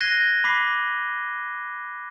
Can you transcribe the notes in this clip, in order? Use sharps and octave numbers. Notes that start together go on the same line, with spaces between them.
F#6 G#6 A#6 C7 D#7 G7
B5 D6 B6 C7